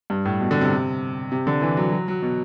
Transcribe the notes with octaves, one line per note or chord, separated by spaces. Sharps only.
G2
A2
B2
D3
C3
C3
D3
E3
F#3
F#3
F#3
B2